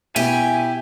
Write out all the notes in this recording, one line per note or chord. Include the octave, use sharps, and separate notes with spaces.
B2 E4 G4 G#5